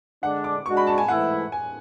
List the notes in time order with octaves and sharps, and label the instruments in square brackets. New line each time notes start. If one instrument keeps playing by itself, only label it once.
[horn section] D3 G#3 D4 [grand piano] F#5
[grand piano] D6
[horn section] G#3 D4 F#4 [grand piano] C#6
[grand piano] B5
A5
G#5
[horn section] G#2 E3 A3 E4 [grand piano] F#5
[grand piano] G#5